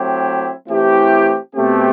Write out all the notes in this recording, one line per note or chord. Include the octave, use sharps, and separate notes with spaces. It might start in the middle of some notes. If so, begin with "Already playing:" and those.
Already playing: F#3 A3 C4 E4 G4
E3 A3 C4 E4 G4
B2 A3 C4 G4